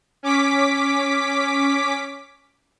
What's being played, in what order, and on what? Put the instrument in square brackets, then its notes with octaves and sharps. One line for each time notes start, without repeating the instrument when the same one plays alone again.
[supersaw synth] C#4 D6 B6